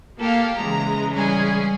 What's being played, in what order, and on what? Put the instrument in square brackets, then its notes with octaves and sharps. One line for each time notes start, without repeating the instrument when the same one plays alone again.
[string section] A#3 F5 [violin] G4 A4
[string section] C#3 E3 G#3 [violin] A#5
[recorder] G3 [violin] C#4 G#4